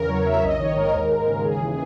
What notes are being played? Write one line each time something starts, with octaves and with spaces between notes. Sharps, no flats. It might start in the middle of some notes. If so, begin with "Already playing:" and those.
Already playing: E2 C#3 A#4
F#3 C#5
C#3 E5
A#1 D#5
D#3 C#5
G#2 A#4
D#2
G#3
C#3
D#2 G#4
E3
G#4